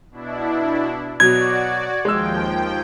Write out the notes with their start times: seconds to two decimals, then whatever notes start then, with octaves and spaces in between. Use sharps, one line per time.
0.11 B2 D4 E4
1.20 B2 F#3 F#4 D5 G#6
2.05 D#2 F3 G#3 G5 E6